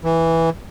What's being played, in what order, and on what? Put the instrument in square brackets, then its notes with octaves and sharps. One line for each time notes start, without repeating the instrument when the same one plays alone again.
[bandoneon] E3